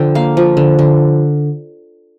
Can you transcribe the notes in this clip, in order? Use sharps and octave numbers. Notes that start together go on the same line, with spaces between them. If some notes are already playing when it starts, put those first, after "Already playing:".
Already playing: D3 F3 G5
A#3 F5
F3
D3
D3